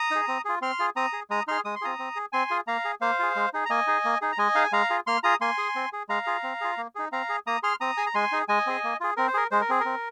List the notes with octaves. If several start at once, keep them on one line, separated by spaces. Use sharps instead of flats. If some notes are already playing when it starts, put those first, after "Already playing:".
Already playing: A#5 D#6
D#4 G#4
C4
F4 G#4
C4 C6 F6
F4 G#4
C4 A#5 D#6
G#4
G#3 A#5 D#6
D#4 G#4 C6 F6
G#3 D#6
C6
C4 F4 G#4 A#5 D#6
C4
G#4
C4 G#5 C6
F4 G#4
A#3 F5 A#5
G#4
A#3 C5 F5
F4 G#4
G#3
D#4 G#4
A#5
A#3 D#5 G#5
D#4 G#4
A#3
D#4 G#4
A#5
G#3 D#5 G#5
D#4 G#4 F5
G#5
G#3 F5 A#5
F4 G#4
A#3 C6 F6
F4 G#4 A#5 D#6
A#3 G#5 C6
G#4
C4
G#4
G#3 F5 A#5
F4 G#4
C4
F4 G#4
A#3
D#4 G#4
C4 F5 A#5
G#4
A#3 A#5 D#6
G#4 C6 F6
C4 A#5 D#6
G#4 G#5
A#5
G#3 G#5 C6
D#4 G#4
G#3 D#5 G#5
C4 G#4
A#3
F4 G#4
C4 A#4
C5
G#4 A#4
G#3 C5
A#4
C4 G#4
C4 A#4